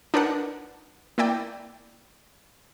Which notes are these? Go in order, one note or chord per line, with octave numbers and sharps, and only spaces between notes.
D4 D#4 A#4 B4 F#5
A#3 E4 D5 G5